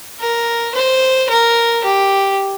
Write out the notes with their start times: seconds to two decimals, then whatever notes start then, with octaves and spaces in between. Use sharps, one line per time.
0.21 A#4
0.75 C5
1.30 A#4
1.84 G4